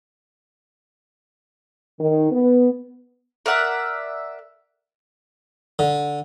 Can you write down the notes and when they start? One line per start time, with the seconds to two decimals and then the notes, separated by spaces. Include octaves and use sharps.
1.99 D#3
2.31 B3
3.46 A#4 D5 E5 F#5
5.79 D3